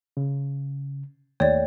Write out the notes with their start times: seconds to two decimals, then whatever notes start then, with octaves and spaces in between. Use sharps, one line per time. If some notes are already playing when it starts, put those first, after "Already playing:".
0.17 C#3
1.40 D#2 A3 C#5 D5 G5